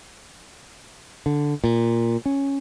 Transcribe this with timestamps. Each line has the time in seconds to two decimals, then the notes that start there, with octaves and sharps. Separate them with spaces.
1.26 D3
1.64 A#2
2.26 C#4